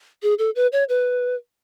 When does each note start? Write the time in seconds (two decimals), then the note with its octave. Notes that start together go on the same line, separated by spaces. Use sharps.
0.23 G#4
0.39 A4
0.56 B4
0.72 C#5
0.89 B4